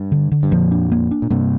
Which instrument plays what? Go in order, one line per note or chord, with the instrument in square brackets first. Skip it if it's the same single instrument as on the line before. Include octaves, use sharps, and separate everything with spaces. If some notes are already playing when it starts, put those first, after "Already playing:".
Already playing: [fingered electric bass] G2
[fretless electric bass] D3
D3
[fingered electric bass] G2
[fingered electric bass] F2 A#2 [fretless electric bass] F3
[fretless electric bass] D4
A#3
D4
[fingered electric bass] A#2
[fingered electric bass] G2 C3 [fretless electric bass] A#3